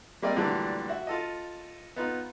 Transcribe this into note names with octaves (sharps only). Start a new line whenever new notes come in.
G3 A#3 C4 D5 D#5
A#2 D3 E3 F#3 G3 A3
F#4 E5
F4 A4 D#5
B3 D#4 F4